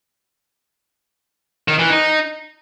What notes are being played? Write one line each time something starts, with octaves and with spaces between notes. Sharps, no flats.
D#3
E3
D#4